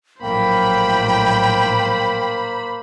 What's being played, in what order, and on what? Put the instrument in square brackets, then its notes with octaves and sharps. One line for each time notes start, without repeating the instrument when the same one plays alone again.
[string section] A#1 A2 F#3 [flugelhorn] A#3 [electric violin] C5 B5 [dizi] G5